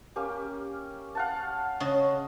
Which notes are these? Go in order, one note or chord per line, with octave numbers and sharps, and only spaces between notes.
A#3 C#4 G4
F5 F#5 A5
C#3 D#5